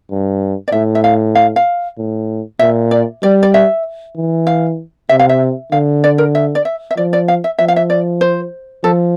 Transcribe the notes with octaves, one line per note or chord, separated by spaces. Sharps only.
G2
D5
A2 E5
E5
F5
F5
F5
A2
A#2 E5
D5
G3 D5
D5
E5
E3
F5
C3 E5
F5
E5
D3 F5
D5
A#4
E5
D5
E5
E5
F3 D5
D5
F5
E5
F3 E5
F5
E5
D5
C5
F3 A4